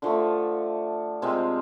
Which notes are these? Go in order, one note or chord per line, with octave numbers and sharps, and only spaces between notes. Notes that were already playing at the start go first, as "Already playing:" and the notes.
D3 F3 A3
C3 F3 G#3 C4